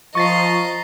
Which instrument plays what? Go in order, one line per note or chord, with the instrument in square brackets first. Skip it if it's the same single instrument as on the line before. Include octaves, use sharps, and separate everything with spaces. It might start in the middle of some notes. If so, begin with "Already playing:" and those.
[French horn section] F3 [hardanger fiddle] D#5 A#5 [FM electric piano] C#6 A6 C7